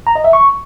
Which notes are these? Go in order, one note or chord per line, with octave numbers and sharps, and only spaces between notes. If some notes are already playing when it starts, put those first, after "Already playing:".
A#5
D#5
E5
C#6